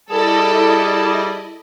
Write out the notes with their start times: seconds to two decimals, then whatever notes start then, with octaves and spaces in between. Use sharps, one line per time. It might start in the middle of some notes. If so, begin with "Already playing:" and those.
0.10 G3 E4 G#4 A4 D5 D#5